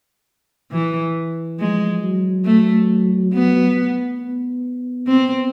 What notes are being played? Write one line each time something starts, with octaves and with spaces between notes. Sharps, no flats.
E3
F3 G#3
F#3
A3
B3
B3
C4